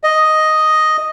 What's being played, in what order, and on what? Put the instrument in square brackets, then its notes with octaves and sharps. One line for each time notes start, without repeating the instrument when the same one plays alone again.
[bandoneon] D#5